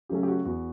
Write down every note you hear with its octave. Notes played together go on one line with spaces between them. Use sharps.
C#3 F#3 A3 C#4 G4
G4
F#4
E2 F#4